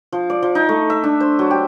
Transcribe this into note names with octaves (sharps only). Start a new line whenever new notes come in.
F3
D5
F3
D#4
A3
E5
D4
C5
F#3
G4